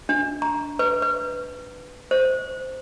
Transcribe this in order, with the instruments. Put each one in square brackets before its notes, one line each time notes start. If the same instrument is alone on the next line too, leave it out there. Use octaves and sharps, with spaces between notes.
[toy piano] D4
A#5
B4
B4
C5